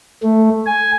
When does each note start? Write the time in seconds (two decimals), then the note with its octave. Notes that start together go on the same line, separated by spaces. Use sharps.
0.23 A3
0.66 G#5